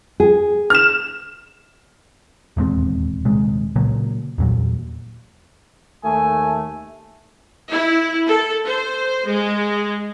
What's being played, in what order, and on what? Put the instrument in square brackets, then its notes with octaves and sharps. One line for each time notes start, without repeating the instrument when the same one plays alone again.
[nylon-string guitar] G#4
[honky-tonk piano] F6 E7
[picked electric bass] D#1 E2 G#2 C4
D#1 C3 G#3
A#2 C#3 F#3 A#3
E2 A#2 F#3
[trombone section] D#2 A3 [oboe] G#5
[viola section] E4
A4
C5
G#3